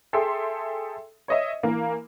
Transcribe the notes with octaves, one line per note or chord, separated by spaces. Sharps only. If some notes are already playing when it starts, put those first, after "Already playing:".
G#4 A4 E5 G5 C6
C#5 D#5 E5
E3 A#3 A#4